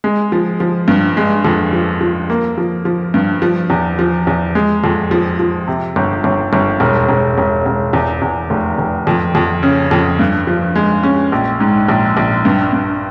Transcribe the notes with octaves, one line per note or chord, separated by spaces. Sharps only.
G#3
F3
F3
G2
G#3
F2
F3
F3
A#3
F3
F3
G2
F3
E2
F3
E2
G#3
F2
F3
F3
C3
G1
G1
G1
E1
E1
E1
E1
E2
E2
F1
F1
F2
F2
C#3
F2
G2
F3
G#3
C#4
A#1
G#2
A#1
A#1
G2
G2